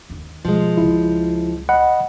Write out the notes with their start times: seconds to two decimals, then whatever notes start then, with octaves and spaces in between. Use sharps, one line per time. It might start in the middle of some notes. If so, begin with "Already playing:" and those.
0.10 D#2 A#3
0.45 B2 F3 G#3
0.77 C#2 C#3 E4
1.69 D#5 F#5 B5